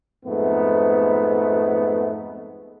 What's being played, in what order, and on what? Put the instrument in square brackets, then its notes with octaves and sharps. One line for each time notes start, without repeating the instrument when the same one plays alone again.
[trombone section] F2 G#2 A3 B3